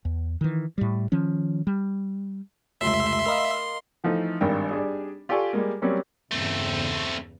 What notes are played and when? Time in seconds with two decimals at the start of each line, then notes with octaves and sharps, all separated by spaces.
0.05 E2
0.41 D#3 E3
0.78 A2 G3
1.12 D#3 F3 C#4
1.67 G3
2.81 F1 C#2 E5 C6
3.26 A#4 D#5 F5 B5
4.04 E3 F3 A3 D#4
4.41 G#1 G2 D4 A#4 G5
4.71 G3 D4 G#4
5.29 F4 G4 A4 D5 G#5 C#6
5.53 G3 G#3 A#3
5.82 F#3 G3 A#3 C4 C#4
6.31 E2 G2 C#3 A3 C4